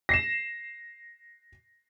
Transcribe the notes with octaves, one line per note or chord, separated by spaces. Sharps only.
A#6 C7 E7